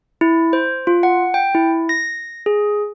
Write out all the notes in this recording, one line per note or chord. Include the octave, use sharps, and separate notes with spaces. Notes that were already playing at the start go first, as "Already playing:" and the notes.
E4
C5
F4
F#5
G5
E4
A#6
G#4